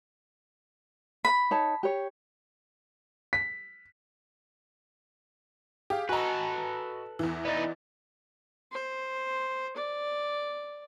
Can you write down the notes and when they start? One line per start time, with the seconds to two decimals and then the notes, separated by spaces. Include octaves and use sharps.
1.25 B5
1.51 D#4 C#5 A5
1.83 G4 C#5
3.33 B6
5.90 G4 G#4 F5
6.09 F#4 A4 B4 D#5 G#5 A#5
7.19 E2 E3
7.45 B3 D#4 D5 D#5 A6
8.72 C5
9.77 D5